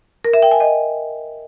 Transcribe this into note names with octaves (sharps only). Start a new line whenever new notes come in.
A#4
E5
G5
G#5
D#5